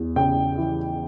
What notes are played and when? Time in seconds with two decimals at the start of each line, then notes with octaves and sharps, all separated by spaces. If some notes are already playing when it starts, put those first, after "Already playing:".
Already playing: E2
0.16 C#3 G5
0.58 E3